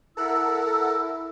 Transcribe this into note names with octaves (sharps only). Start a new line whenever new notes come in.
E4 A4 A#4 F#5 E6